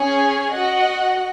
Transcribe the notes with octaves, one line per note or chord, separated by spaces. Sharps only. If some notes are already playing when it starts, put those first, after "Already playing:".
Already playing: C#4 G#4 C#5 G#5
F#4 D#5 F#5